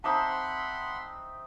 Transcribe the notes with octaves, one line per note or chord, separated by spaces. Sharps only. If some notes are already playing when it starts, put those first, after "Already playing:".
C4 D#4 E5 F#5 A5 B5 C6 D6